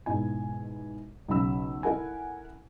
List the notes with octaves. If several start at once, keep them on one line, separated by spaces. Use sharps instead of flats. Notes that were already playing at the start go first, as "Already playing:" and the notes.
G#2 B2 E4 G#5
B1 C#3 F#3 B5 E6
E4 A4 A#4 F#5 G#5